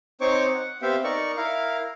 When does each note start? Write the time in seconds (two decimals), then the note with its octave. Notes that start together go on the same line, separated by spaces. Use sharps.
0.21 C4 D#4 C5 C#5 C#6 D6
0.54 F#5
0.82 B3 C4 G4 E5 F5 G5
1.04 D#4 A#4 D5 C#6
1.37 E4 A#4 F5